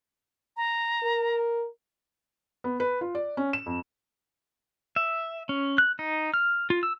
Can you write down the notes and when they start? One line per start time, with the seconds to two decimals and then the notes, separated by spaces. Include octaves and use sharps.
0.57 A#5
1.03 A#4
2.64 B3
2.80 B4
3.01 F4
3.15 D5
3.37 C#4
3.53 E7
3.66 F2
4.96 E5
5.49 C#4
5.78 F#6
5.99 D#4
6.34 F6
6.70 F4
6.83 E6